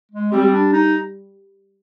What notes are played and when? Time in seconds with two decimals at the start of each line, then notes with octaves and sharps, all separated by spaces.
0.12 G#3
0.32 G3 C4
0.53 D4
0.73 D#4